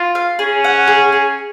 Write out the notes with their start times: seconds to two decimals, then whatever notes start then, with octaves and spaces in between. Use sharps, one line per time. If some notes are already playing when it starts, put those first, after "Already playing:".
Already playing: F4
0.15 F5
0.39 C#4 G#4
0.64 F#5
0.88 G#4
1.12 G#4